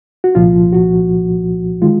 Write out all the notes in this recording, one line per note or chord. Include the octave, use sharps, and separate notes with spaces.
F#4
C2 A#2 F3 F4
F#4
D#3 G#3 F4